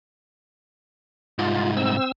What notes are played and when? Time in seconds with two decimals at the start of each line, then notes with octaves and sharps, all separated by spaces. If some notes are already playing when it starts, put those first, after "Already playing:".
1.39 C2 G#2 F4
1.77 C4 E6